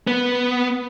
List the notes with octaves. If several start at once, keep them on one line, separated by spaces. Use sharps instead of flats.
B3